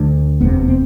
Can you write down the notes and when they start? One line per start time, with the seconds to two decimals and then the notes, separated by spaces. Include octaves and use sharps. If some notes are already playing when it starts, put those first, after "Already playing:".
Already playing: D2 D3
0.40 F1 E2 C3 B3
0.68 C4